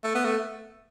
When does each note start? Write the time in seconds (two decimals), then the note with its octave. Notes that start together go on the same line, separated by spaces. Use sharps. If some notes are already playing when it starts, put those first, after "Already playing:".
0.04 A3
0.15 B3
0.25 A3